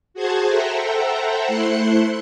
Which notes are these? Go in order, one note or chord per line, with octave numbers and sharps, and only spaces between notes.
F#4 G#4 C5 G#5 A5
A4 C5 E5 F#5 G5 A#5
A3 E4 C5 C6 F#6 C#7